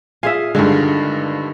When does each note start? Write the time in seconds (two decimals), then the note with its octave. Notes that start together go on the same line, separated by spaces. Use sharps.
0.23 F4 G#4 E5 G#5 C7
0.55 G2 D3 D#3 G#3